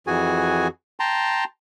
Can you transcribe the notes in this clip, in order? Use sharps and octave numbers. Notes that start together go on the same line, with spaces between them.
F2 E3 F#4 G#4 G#5
G5 A5 A#5 C6